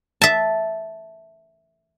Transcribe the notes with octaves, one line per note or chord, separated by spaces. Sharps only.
E5 A5